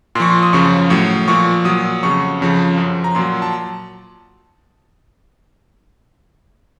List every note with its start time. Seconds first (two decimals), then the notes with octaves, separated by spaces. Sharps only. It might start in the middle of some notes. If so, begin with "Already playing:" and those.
0.15 A#2 C6
0.20 F3 C#6
0.30 C6
0.43 D#6
0.53 F#2 C#3 F3 C#6
0.90 A2 F#3
1.27 A#2 F3 C#6
1.65 A#2 F#3 D#6
2.03 F2 C#3 F#3 C#6
2.41 F2 C#3 F3
2.77 F#2 F3
3.04 A#5
3.15 A#2 F#3 C6
3.42 A5